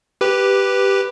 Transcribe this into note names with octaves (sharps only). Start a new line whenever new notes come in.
G4 B4